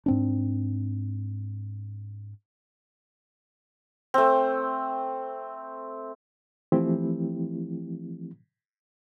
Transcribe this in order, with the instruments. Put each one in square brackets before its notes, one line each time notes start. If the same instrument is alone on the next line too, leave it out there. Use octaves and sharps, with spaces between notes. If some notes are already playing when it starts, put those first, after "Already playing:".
[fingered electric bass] G#2 C4 D4
[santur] A3 C4
[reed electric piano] E3 F3 A3 C4 E4 G4